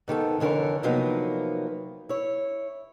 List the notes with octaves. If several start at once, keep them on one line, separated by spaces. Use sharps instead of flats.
G#2 D#3 B3 A4
F2 D3 E3 A#4 C#5
C3 F3 F#3 A#3 B3 D#4
E4 C#5